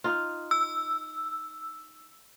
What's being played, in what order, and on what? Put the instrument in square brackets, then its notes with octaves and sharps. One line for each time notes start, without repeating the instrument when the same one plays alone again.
[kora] D#4 F4
[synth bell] E6